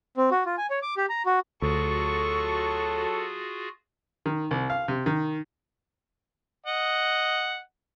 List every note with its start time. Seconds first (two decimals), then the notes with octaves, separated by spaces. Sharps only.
0.17 C4
0.31 F#4
0.46 F4
0.58 G#5
0.70 C#5
0.82 D6
0.97 G4
1.09 A#5
1.26 F#4
1.62 D2 F#3 F4 F#4 G#4 A4 C#6
4.26 D#3
4.51 C2
4.70 F5
4.88 C3
5.06 D#3
6.66 D#5 F#5